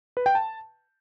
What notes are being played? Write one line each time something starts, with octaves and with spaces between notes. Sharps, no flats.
B4
G5
A5